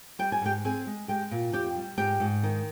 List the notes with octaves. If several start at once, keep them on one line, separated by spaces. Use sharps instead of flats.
G3 G5
G#5
G#2 G4 G5
C4 G#4 G#5
G#3
G#3 G4 G5
A#2
F2 G4 G5
G3
G#2 G4 G5
G#2
D#3